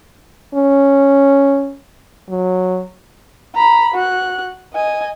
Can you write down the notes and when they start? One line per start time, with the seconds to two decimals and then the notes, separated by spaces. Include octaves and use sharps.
0.55 C#4
2.30 F#3
3.54 A#5 B5
3.94 F#4 F#6
4.73 D#5 G#5